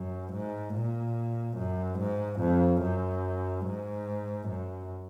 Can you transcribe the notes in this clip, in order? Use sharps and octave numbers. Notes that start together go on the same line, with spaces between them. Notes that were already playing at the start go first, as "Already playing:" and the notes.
Already playing: F#2
G#2
A#2
F#2
G#2
F2
F#2
G#2
F#2